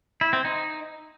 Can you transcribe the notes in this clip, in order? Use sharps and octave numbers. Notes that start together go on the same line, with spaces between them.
E4
C4
D#4